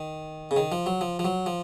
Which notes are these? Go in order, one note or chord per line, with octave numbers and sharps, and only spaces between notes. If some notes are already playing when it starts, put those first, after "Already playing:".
Already playing: D#3
C#3
D#3
F3
F#3
F3
F3
F#3
F3